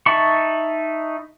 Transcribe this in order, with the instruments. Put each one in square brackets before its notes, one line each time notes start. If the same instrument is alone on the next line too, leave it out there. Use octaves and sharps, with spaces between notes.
[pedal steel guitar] D#4 E5 A5 B5 C#6